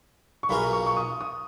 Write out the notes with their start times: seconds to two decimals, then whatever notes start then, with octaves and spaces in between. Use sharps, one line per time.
0.43 C#6
0.49 B1 B2 A#3 F4 G#4 B5
0.73 C#6
0.86 C#6
0.97 D#6
1.21 D#6